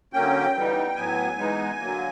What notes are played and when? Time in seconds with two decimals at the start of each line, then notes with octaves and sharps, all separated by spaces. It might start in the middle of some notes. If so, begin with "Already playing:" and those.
0.13 D3 F#3 A#3 C#4 G5
0.54 E3 G3 B3 D#4
0.96 A2 F#3 B3 G#5
1.38 E3 G#3 B3 D#4
1.79 D3 F#3 A#3